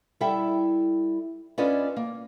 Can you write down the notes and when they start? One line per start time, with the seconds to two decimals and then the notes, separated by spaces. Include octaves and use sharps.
0.21 G3 E4 A4 E5 G5
1.58 C#4 D4 F4 B4 C#5 D#5
1.97 A#3